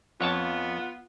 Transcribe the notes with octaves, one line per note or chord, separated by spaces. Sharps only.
F2 B3 F4 C#5 A5